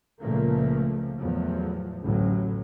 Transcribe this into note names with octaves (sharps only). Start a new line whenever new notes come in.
C#2 A#2 F3 A3 A#3
E2 A2 F3 F#3
A1 D2 A2 F#3